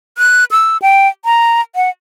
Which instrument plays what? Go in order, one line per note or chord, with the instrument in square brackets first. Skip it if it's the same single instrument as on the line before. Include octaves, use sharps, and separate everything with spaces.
[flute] F#6
E6
G5
A#5
F#5